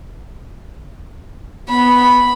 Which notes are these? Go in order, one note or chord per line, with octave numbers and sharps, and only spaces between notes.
B3 B5